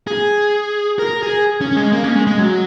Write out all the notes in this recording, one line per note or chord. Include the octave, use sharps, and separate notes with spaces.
G#4
A#4
G#4
C#4
G#3
A#3
C#4
G#3
G#3
F#3